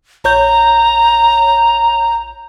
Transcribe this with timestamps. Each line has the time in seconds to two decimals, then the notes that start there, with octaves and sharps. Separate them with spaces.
0.24 A#1 C#5 A#5 G6